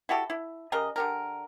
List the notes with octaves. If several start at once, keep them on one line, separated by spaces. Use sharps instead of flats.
E4 F#4 G4 A4
E4
C#3 G4 A#4 D#5
D3 G4 A#4